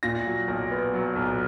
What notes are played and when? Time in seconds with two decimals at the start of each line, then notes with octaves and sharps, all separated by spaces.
0.03 A#2 A#6
0.26 F#3
0.48 B1
0.71 B3
0.94 F#3
1.16 B1